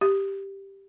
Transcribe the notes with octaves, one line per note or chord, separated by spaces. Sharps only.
G4